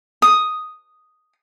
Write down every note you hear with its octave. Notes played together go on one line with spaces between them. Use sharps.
D#6